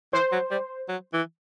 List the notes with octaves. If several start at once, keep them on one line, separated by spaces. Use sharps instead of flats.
E3 C5
F#3
G3
F#3
E3